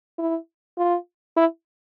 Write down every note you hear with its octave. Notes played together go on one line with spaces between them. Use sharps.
E4
F4
E4